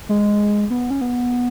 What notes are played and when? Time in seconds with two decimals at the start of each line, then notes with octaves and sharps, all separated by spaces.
0.09 G#3
0.70 B3
0.90 C#4
1.01 B3